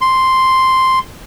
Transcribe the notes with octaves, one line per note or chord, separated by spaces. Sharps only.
C6